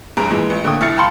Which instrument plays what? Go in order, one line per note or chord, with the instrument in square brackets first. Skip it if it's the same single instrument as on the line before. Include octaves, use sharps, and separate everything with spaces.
[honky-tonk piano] F1 C2 G2 G#3 A#5 D7
A#2 E3 G#3
A1
D3 A3 A#3 G5 D#6
C2 E4 F6 A6 C7 C#7
F5 G5 A5 B5 C6 C#7